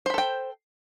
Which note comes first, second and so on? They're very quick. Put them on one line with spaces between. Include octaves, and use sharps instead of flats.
C5 B5 A4 G5